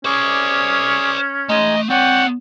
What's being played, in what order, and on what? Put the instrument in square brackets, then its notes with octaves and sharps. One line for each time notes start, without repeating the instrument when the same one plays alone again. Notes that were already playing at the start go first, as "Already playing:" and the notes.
[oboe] C#4 [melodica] G#4 C#6 D6 [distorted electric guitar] C5 D5
[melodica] G#3 D#4 G#5 [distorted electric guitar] A3 C6 [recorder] D#5
[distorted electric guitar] C4 C#5 [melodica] D5 C#6 [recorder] F#5 [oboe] G5